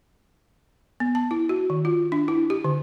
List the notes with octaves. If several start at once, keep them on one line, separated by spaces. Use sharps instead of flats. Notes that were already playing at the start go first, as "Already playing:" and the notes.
B3
A5
E4
F#4
D#3
F4
D4
E4
G4
D3